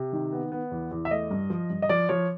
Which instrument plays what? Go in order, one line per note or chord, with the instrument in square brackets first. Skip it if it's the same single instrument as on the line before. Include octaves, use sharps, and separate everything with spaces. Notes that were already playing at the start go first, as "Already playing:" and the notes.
Already playing: [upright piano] C3
D#3
B3
B3
E2
E2
E5
A3 D#5
G2
F3
G2
D#5
F3 D5
F3 C#5